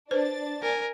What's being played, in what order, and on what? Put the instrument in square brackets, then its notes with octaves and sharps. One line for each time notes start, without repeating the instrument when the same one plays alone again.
[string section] D4 A6 [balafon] B4 C5
[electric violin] A#4 G#5